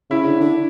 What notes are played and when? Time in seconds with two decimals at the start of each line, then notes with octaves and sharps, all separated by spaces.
0.10 C#3 E4
0.25 D3
0.41 D3